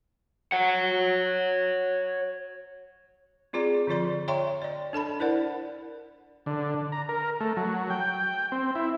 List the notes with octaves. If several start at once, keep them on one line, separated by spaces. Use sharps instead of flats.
C#5 F#5
C4 F4 G#4 D5 A#5
D3 F3 F4 D5 C6
C#5 E5 G5 A#5 C6 C#6
D5 D#5
D4 A4 A5 B5
E4 A#4 C5 D5 F#5
D3
A#5
A#4
A3
F#3
G5
C4
E4